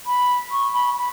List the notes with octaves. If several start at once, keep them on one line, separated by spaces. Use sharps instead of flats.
B5
C#6
B5
B5